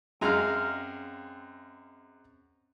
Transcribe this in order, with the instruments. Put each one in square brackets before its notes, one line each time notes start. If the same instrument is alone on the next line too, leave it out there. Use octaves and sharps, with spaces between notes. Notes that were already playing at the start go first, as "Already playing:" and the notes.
[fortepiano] F#2 G#3 A#5 [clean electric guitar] C4 F5